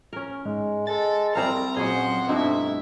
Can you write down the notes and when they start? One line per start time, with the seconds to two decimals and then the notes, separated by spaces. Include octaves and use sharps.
0.13 C#4 A#4
0.45 G#2 G#3
0.87 G#3 A4 A6
1.35 C2 G3 C4 F5 A#5
1.76 A#1 F2 F#3 C#4 G#4 C5 D#5 F#5
2.29 G2 B2 A3 C4 D#4 E4 F#4 E5